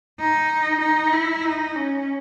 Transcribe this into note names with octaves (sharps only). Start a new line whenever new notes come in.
D#4
D#4
E4
D#4
C#4